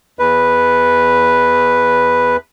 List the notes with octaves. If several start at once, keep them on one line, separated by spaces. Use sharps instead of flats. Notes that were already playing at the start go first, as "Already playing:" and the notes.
E2 B4